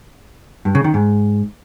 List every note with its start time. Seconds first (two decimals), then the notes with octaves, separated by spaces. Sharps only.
0.65 G2
0.75 C#3
0.84 D#3
0.94 G#2